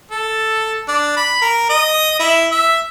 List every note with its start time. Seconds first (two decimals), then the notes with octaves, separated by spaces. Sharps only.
0.11 A4
0.88 D4
1.16 B5
1.41 A#4
1.69 D#5
2.19 E4
2.51 E5